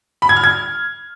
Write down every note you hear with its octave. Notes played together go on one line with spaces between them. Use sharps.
B5
G#6
F6
G#6